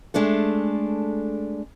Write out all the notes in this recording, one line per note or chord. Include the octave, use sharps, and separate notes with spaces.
G#3 A3 D4 A4